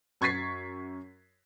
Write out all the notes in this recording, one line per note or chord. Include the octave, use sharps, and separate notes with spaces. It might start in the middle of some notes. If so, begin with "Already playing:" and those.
F#2 C#6 G#6 A6 B6 C7